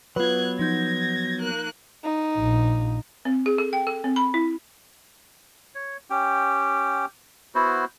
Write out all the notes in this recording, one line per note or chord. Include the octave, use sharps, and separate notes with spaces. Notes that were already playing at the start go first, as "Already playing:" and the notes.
F#3 B3 F4 B4 F#6 G#6
F3 D#4 G6 G#6 A#6
A#3 F#6
D#4
A#1
C4
G#4
A4
G5
A4
C4
B5
E4
C#5
C#4 G4 G5
B3 E4 F#4 C5